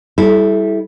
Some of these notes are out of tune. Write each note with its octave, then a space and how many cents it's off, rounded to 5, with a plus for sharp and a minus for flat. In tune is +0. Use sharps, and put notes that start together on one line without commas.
G3 +0 E4 -10 A4 -30